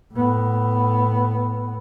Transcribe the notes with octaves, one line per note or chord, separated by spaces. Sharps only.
A2 B3